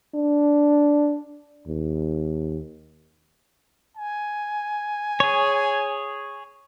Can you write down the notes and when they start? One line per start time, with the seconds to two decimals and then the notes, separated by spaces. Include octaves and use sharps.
0.14 D4
1.67 D#2
3.97 G#5
5.20 G#4 C#5